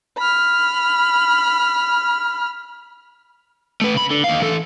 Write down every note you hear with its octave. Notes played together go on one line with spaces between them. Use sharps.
B5 F6
A3 B4
C#3 B5
D3
D#2 F5
E3 A4